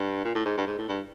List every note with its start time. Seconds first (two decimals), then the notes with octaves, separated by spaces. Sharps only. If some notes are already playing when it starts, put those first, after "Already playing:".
Already playing: G2
0.24 A#2
0.35 A2
0.46 G#2
0.57 G2
0.67 G#2
0.79 A2
0.89 G2